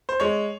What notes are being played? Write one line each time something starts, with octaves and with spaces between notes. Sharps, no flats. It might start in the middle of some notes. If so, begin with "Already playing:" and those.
C5
G#3 C#5